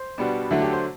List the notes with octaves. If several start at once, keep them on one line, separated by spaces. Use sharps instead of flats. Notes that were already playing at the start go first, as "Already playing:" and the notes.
Already playing: C5
B2 G3 B3 D4
D3 F#3 A3 E4
G4
C5